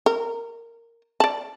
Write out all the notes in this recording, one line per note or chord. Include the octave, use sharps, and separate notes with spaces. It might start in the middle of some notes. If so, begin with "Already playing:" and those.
A#4
D5 A5